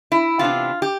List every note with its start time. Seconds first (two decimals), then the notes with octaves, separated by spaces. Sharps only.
0.12 E4
0.39 C3 E3 B3 D4 F4
0.82 G4